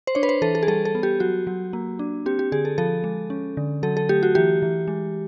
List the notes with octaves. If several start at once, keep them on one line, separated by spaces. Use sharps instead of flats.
C5
D4 C#5
B4
C5
E3 A4
A4
G#4
G3 A4
A4
B3
G4
F#3 F#4
F#3
A#3
D4
C4 G4
G4
D3 G#4
A4
F3 A4
G#3
C#4
D3
F#3 A4
A4
A3 G4
F#4
E3 G4
E3
G#3